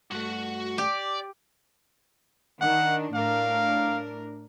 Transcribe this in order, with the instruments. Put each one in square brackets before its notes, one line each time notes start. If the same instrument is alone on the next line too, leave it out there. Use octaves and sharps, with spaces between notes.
[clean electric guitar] G2 A3 [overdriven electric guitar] F#4 F#5
[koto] G4 [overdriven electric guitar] D5
[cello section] D#3 D4 [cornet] F#5
[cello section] A2 D4 A#4 [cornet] F5